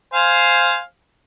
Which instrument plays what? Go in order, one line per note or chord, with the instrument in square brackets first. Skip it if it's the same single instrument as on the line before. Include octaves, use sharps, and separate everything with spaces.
[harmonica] C5 F5 G#5